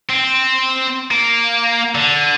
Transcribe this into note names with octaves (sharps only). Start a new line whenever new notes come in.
C4
A#3
D3